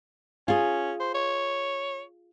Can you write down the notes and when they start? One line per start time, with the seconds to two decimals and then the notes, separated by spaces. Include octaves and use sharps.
0.48 C#4 F4 G#4
1.00 C5
1.15 C#5